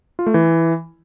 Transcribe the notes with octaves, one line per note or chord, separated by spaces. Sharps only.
F4
A3
E3